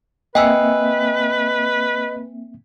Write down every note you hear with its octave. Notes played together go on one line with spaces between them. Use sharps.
A#3 C4 B4 D#5 E5 G5 G#5 E6